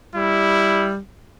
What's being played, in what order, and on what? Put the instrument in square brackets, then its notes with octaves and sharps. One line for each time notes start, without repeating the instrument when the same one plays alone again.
[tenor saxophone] G3 [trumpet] E4